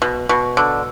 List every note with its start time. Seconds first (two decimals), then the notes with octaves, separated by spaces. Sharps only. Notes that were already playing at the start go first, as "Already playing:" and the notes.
0.02 B2
0.29 B2
0.57 D3